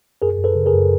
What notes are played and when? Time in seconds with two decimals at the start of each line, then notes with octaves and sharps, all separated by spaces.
0.22 F#2 G#4 A#4
0.38 F#2
0.44 A4 B4
0.55 C#3
0.66 G#4 A#4
0.73 F#2